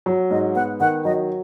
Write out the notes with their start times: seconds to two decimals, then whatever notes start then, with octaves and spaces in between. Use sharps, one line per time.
0.06 F#3
0.30 G#2 D#5
0.55 B3 F#5
0.80 D#3 F#5
1.05 F#3 D#5